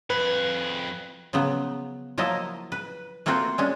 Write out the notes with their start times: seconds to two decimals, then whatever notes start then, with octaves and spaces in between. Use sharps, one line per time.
0.10 F2 G#4 B4
1.33 C#3 F3 F#3 B3
2.18 F3 F#3 A#3 E4 D#5 A5
2.72 B4
3.26 A3 A#3 C4 F4 F#4 C5
3.58 G#3 C#4 D4